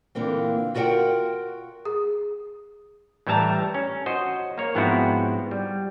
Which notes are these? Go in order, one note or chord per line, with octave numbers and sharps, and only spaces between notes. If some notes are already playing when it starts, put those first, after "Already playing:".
A#2 D3 E3 A#3 C4
F4 F#4 A#4 D5 F#5 G5
G#4
A2 E3 G3 E5 A5 A#5
C#4
F#4 C5 D#5
A#3 C#5
G#2 F3 B3 C4 E4 F#4
G3